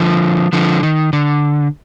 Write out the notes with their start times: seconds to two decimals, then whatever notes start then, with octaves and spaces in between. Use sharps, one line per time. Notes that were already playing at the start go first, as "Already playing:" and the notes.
Already playing: D3 F3
0.53 D3 F3
0.83 D#3
1.13 D3